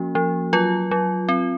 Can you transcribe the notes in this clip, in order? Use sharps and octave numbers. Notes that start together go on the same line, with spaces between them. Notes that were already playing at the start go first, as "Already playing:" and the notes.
Already playing: F3 A#3 C#4 F#4
F3
F#3 F4
F#3
C4